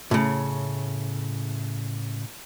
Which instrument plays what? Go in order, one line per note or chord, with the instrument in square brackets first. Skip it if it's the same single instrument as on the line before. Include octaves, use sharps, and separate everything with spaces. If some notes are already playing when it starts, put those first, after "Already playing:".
[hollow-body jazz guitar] A2 C#3